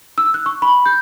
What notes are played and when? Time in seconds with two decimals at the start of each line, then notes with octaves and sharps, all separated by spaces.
0.18 E6
0.34 F#6
0.46 C#6
0.62 B5
0.86 G6